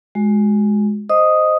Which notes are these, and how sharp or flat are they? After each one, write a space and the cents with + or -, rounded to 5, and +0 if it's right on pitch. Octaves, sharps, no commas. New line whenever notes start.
G#3 +5 F#4 +0
C5 +0 D#5 +0 D#6 +0